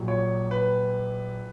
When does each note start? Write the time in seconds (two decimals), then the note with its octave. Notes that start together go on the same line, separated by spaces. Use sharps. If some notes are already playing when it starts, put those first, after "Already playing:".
Already playing: A#1 A#2 F#3
0.08 C#5
0.51 B4